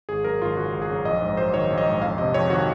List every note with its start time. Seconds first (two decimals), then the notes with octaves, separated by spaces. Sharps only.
0.09 G#1 G#4
0.24 F#2 A#4
0.41 G#1 F4
0.57 C#3 F#4
0.73 G#1
0.82 G#4
0.90 F#2
1.05 A#1 D#5
1.22 G#2
1.37 F#3 C5
1.54 D#3 C#5
1.70 A#1
1.78 D#5
1.86 G#2
2.02 F2 F5
2.18 C3 D#5
2.34 F2 C#5
2.50 D#3 F#4